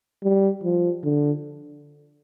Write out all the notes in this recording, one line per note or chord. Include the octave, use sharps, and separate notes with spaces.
G3
F3
D3